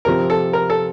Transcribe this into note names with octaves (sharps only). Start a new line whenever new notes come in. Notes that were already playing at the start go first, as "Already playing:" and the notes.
C3 F3 C4 A#4
A4
A#4
A4